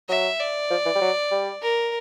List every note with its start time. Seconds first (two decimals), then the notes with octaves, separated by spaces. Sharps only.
0.09 F#3 E5
0.40 D5
0.71 F3
0.85 E3
0.96 G3
1.01 F#3
1.31 G3
1.62 A#4